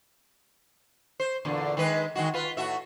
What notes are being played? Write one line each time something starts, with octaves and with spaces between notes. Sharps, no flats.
C5
E2 A#2 D3
D#3 G#3 B4
D#3 G#3 F#4
F4 B4
A2 F#4 E5